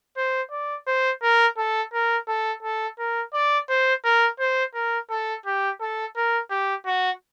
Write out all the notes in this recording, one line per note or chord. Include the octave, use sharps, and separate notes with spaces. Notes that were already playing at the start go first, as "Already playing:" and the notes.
C5
D5
C5
A#4
A4
A#4
A4
A4
A#4
D5
C5
A#4
C5
A#4
A4
G4
A4
A#4
G4
F#4